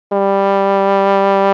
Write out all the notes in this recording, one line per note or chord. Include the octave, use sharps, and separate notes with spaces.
G3